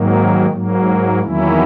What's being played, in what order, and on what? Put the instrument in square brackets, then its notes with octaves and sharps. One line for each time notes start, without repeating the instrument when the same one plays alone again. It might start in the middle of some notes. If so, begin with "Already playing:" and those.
Already playing: [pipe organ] G#2 D#3 F#3 A#3
G#2 F#3 A#3
E2 D#3 F#3 A#3 C#4 E4